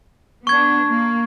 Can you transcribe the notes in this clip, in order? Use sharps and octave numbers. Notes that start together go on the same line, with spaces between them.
B3 D4 C#6 G#6
A#3